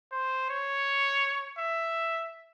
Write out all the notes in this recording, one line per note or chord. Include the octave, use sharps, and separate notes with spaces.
C5
C#5
E5